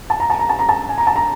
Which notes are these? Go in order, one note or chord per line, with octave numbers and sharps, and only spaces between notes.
A5
A#5
A5
A#5
A5
A#5
A5
G#5
A#5
A5
A#5